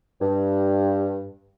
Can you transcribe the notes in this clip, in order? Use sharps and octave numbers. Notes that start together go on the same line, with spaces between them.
G2